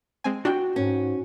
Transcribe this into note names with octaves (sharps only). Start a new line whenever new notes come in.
G#3 C4 G#5
D4 F#4 G5
G#2 C#4